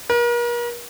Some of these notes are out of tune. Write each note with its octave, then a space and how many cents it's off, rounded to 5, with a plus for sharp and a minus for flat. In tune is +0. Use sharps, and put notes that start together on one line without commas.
A#4 +40